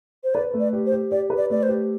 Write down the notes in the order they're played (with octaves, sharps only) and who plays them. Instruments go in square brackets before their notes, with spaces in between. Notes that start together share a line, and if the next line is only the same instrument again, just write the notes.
[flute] C5
[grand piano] B4 [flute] D5
[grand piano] A3
[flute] D5
[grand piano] G4
[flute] C5
[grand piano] G4
[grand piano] G4 [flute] D5
[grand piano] B4
[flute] D5
[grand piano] A3 [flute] D5
[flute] C5
[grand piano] G4